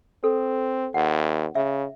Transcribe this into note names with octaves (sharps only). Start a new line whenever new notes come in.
C4 A4
D#2 F#5
C#3 E5